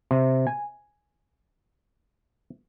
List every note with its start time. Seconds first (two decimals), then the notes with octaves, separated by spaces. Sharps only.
0.11 C3
0.47 G#5